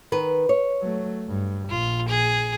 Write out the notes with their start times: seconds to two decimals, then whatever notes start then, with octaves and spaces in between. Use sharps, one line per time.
0.12 D#3 B4
0.49 C#5
0.81 F#3 A3
1.28 G2
1.70 A#1 F4
2.08 G#4